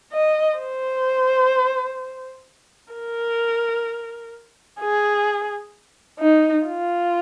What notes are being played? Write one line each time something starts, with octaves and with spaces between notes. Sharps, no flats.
D#5
C5
A#4
G#4
D#4
F4